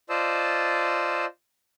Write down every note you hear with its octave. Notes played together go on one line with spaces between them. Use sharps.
F4 C5 D5 D#5 A5 E6